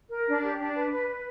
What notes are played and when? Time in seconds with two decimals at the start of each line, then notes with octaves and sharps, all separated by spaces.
0.11 A#4
0.27 D4
0.42 G4
0.59 D4
0.74 B4
0.91 B4
1.07 B4